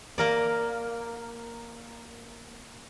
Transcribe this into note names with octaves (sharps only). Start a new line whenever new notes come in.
A#3 A#4 D5